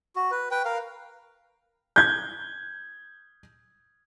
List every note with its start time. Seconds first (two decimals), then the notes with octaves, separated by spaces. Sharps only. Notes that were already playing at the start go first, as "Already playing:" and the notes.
0.16 F#4
0.31 B4
0.51 B4 G5
0.65 A#4 F5
1.96 G6 G#6